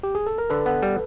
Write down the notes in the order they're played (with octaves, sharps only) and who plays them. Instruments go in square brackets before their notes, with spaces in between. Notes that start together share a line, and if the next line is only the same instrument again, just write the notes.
[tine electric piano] G4
G#4
A4
A#4
[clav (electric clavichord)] D3 [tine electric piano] A4 B4
[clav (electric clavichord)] B3
G3